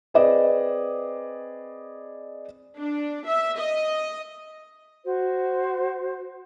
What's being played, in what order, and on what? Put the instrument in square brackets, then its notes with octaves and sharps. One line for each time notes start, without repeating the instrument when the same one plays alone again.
[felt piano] C4 G#4 B4 D5 D#5
[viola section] D4
E5
D#5
[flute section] F#4 C5